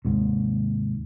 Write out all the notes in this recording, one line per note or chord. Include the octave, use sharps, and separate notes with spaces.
D#2 G#2 C3